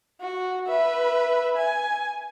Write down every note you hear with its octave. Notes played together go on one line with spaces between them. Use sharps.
F#4
B4 E5
G#5